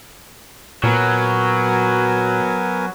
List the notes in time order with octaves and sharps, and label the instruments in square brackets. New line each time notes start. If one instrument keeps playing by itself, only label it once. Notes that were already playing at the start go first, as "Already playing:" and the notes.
[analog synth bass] A#2 [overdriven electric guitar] F#3 [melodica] B3 A#4 G#5